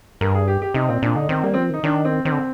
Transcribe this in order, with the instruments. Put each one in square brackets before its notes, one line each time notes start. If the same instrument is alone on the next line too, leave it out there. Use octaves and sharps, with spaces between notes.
[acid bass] G2 [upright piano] A#4
[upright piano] G#4
G4
G4
[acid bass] C3 [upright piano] D#4
[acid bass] A#2 [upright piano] C4
[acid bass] A#2 [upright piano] D4
[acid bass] D3 [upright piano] D#4
[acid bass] D#3 [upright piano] C4
[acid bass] G3 [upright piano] A#3
[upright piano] C4
[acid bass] F3
[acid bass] D#3 [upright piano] D#4
[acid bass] D#3 [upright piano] D4
[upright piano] C4
[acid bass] D#3 [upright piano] C4
[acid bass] D3